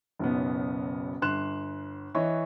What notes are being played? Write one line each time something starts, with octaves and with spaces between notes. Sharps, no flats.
F#1 B1 B3
G1 C6 F#6 E7
E3 C#5 D#5 C#6